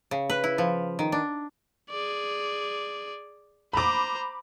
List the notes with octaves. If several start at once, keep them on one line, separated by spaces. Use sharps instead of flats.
C#3
B4
E4
F3
D#3
D4
G#4 D5
C5 A#5 B5 D6